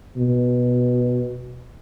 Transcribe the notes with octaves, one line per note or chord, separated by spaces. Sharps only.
B2